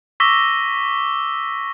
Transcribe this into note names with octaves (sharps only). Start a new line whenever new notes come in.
C#6 D6 E6 A#6 B6 G7